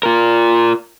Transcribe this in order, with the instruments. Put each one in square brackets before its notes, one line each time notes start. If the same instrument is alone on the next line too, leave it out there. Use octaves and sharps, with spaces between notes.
[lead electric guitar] F4 A#4